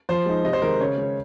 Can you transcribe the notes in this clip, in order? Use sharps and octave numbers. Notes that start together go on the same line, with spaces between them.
F3 C5
G#3 D#4
C3 D#5
C5
D#3 G#3 A#4
C#3 C#5
G#3 C#4